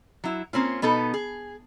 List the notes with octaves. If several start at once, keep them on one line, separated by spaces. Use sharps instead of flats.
F#3 E4
A#3 C4 C#4 F4
B2 B3 D#4 A4
G#4